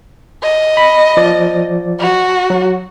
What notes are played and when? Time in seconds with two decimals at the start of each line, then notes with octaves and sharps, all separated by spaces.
0.43 D#5
0.77 B5
1.17 F3 D5
2.00 F#4
2.50 F#3